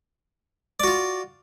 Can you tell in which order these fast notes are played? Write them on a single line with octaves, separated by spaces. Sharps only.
D5 F#4 F4